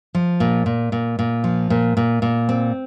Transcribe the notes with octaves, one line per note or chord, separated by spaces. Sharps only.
F3
A#2
A#2
A#2
A#2
F3
A#2
A#2
A#2
C4